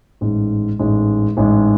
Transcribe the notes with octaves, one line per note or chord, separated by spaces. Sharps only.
A1 G#2 G#3
A1 G#2 G#3
A1 G#2 G#3